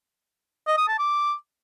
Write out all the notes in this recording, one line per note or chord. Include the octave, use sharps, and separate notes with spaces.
D#5
D#6
A5
D6